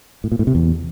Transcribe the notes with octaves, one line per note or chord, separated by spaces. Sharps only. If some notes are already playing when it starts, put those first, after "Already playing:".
A2
A#2
A2
C3
E2